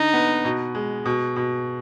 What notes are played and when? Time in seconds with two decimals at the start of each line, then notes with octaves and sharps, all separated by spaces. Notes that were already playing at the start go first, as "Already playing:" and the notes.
Already playing: D3 D#4
0.14 B3
0.44 B2
0.75 G#3
1.05 B2
1.36 B2